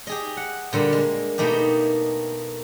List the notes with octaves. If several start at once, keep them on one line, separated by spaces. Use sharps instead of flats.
G4 G#4 D#5
F#5
A#2 D3 G3 A#3
G#3
B2 A3 A#3 D#4 G4